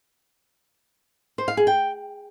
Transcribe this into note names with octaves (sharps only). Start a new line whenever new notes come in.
C5
F5
G#4
G5